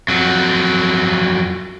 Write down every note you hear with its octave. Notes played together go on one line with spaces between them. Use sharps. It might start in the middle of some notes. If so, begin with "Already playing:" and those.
F2 F#3